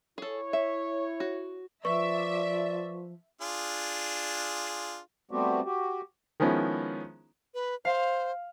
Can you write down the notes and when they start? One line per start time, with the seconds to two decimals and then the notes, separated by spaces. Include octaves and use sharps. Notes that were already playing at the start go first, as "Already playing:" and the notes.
0.18 E4 G#4 A4 C#5
0.53 E5
1.20 F#4
1.85 F3 B4 D5 E5 C#6
3.41 D4 F4 G#4
5.31 G3 A3 B3 C4 F#4 G4
5.65 F#4 G4
6.40 D#3 F3 G#3 B3 C#4 E4
7.54 B4
7.85 C5 F5